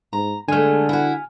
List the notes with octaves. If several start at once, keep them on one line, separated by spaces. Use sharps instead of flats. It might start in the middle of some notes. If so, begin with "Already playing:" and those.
G#2 A#5
D3 G#3 A3 G#5 F6
E4 F#4